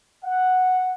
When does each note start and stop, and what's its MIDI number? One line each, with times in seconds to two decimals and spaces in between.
0.24 0.94 78